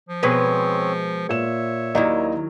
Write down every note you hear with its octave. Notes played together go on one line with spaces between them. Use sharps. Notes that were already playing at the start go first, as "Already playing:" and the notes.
F3
B2 G#3 C4 B4 C#5
A#2 C#5 E5 E7
D#2 D#3 F#3 E4 D5 D#5